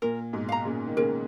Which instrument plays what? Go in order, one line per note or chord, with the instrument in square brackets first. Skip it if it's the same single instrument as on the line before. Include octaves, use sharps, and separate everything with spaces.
[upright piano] A#2 [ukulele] A#4
[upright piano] G#2 B2
[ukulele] F5 A#5
[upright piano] A#2 C#3
D#3
[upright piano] A#2 C#3 [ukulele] A#4